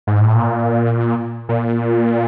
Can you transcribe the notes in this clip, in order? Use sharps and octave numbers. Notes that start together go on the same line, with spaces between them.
G#2
A2
A#2
A#2